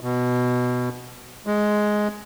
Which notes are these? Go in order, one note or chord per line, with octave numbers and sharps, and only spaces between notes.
B2
G#3